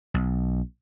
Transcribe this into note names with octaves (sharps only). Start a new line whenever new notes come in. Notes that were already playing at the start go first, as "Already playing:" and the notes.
B1